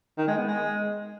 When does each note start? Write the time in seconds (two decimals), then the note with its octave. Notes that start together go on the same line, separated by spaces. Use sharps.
0.18 D#3
0.28 G#3
0.38 B3
0.48 G#3